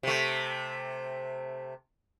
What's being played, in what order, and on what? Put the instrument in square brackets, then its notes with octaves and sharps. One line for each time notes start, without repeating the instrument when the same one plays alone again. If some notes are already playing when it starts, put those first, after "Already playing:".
[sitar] C3 A3